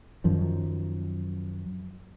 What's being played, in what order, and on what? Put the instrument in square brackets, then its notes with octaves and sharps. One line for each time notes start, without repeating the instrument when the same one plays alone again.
[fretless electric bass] F#2 D#3 F3